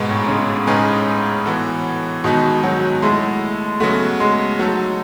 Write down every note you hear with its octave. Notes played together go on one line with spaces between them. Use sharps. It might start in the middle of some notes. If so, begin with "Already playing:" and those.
Already playing: G#2 B2 G#3 B3
A2
C#3
A2 C#3 G#3 D#4 G#4 B4
E3 B3 F#4 A4
B2 D#3 G#3 B3 D#4 F#4
F#3
G#3 A3 E4 A4
C#3 F#3 A3 B3 F#4
G#3
F#3 A3 D#4 A4